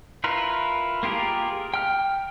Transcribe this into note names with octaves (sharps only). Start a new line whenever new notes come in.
E4 F4 A#4 B4
A#3 F4 G4 G#4 A#4
G5 F6